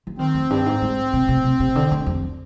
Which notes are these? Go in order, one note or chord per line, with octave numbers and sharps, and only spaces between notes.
F3
D#3 C4
F2
G2
G#2
G#2
C3
C3
C3
C3
D3
D3
F2